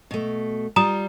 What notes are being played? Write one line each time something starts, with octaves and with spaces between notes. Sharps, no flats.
B2 A3
G3 F4 A#5 D#6